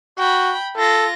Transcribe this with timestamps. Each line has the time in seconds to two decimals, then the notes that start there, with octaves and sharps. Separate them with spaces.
0.18 F#4 G5 B5
0.77 F4 A4 A#6